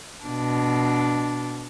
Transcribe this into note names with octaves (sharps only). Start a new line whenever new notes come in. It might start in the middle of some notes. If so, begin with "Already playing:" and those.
B2 D4